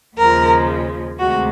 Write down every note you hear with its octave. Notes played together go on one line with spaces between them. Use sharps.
D#2 C#3 F3 G#3 A#4
D2 C3 D#3 G#3 F#4